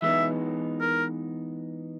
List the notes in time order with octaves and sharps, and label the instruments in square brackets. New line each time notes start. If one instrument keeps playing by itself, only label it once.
[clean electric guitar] E3 G#3 B3 D#4 [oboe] E5
[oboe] A#4